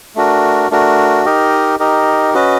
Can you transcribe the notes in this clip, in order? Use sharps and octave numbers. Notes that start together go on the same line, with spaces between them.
A3 D4 F#4 A#4
A3 D4 F#4 A#4
D#4 G4 A#4 D#5
D#4 G4 A#4 D#5
C#4 F#4 B4 D#5